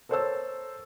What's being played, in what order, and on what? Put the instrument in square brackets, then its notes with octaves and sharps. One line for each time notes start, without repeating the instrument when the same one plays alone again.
[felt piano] A4 A#4 C5 C#5 A5 E6